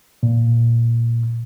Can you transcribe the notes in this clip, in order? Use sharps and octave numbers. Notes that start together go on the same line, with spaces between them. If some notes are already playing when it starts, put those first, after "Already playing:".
A#2